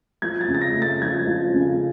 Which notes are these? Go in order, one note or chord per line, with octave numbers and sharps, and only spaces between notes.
F3 G#6
A6
C#3
A6
A#6
A3
A6
F3 G#6
F3
C#3